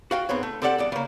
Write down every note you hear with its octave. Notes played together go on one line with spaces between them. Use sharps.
F#4 F5 G5
G#2 B3 C4 C#5
A3
C4 G4 A4 D5 E5 F#5
E2 G2 D5
C#3 A#3